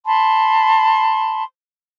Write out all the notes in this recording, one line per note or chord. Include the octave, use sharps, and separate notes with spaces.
A5 B5 C6